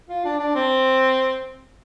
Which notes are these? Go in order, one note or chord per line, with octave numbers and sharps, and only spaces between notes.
F4
D4
D4
C4